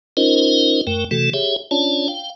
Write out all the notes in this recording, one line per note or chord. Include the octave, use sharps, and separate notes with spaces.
C#4 D#4 F4 A#4 C5 D#5
F#2 A3 A#4 G5
C3 E3 A3 F#4 A4
G4 G#4 C#5 E5
C#4 D4 F4 C#5 D5 A5
F5 G5